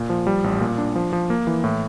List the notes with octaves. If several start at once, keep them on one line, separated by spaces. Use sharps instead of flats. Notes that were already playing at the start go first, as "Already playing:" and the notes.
Already playing: A#2
F3
G3
A1
A#2
D4
F3
F3
A#3
E3
A2